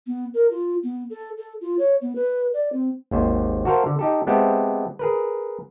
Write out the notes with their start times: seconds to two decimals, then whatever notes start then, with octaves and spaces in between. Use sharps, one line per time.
0.07 B3
0.34 A#4
0.50 F4
0.83 B3
1.10 A4
1.38 A4
1.61 F4
1.79 C#5
2.01 B3
2.15 B4
2.53 D5
2.72 C4
3.11 G#1 D#2 C5
3.65 F#4 A4 A#4 C5 F5
3.86 D3
3.99 D#4 G4 A4
4.27 G#3 B3 C4 G4 A4 E5
4.99 G#4 A#4 B4